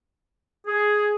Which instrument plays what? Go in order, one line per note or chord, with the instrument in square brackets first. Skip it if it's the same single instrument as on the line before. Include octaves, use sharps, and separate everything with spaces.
[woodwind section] G#4